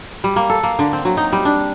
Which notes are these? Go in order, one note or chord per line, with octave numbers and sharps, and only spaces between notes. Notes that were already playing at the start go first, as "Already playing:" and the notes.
G3
A#3
A4
A#3
D3
C4
F#3
D#4
G3
D4